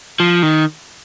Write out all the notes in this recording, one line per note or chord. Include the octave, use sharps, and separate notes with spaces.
F3
D#3